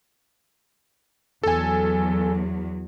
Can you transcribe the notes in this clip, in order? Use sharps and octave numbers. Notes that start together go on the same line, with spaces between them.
E2 F#3 A4 G#5